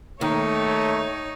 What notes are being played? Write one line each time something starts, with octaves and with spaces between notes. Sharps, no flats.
D#2 D#3 A3 D#4 C#5